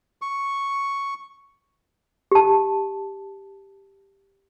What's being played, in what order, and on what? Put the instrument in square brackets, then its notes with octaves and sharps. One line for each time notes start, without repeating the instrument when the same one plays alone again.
[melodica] C#6
[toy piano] G4 A5